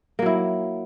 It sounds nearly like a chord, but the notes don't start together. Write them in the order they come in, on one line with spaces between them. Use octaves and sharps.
A#3 F#3 E4